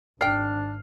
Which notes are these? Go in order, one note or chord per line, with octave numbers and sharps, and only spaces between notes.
G#1 D4 D5 G5 F6 C7